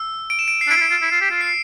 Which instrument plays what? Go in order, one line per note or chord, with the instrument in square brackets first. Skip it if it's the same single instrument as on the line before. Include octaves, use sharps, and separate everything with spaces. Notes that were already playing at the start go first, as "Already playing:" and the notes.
Already playing: [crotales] E6
D7
E7
D7
C7
[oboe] D4
[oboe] E4 [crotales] D7
[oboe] F4
E4
F4
E4
F4
G4
F4
[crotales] C7